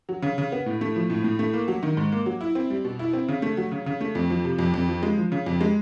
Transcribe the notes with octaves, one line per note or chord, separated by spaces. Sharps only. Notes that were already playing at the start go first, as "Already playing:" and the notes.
F#3
C#3
C#3
B3
A2
A3
F3
A2
A2
A3
A#3
F#3
D#3
G#2
A#3
F#3
E4
C4
G3
B2
E4
C4
C#3
A3
F#3
C#3
C#3
A3
F2
F3
C3
F2
F2
F3
G#3
F3
C#3
F2
G#3